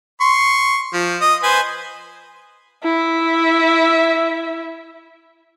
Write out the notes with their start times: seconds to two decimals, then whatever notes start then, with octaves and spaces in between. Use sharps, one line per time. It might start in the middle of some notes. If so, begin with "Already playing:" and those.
0.21 C6 C#6
0.93 F3
1.21 D#5
1.43 B4 C5 G#5
2.84 E4 E5